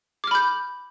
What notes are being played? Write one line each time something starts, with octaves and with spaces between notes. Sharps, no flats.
B5 D6 F6 G6